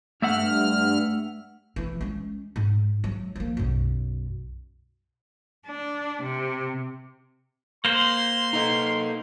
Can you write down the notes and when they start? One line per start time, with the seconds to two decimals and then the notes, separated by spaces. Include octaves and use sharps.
0.22 G2 A3 E5 F#5 F6
1.76 E3 C4
2.01 G#3 C#4
2.56 G#2
3.04 F#3
3.36 F3 A#3
3.57 B1 F#2
5.67 D4
6.23 C3
7.85 A#3 C5 C6
8.53 D#4 A4 D#5